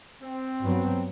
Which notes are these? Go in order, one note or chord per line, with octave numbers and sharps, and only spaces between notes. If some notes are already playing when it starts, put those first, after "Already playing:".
C4
G2 F#3 B3